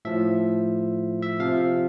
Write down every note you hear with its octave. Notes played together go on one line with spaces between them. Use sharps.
A2 F3 E5
E5
C3 F3 F5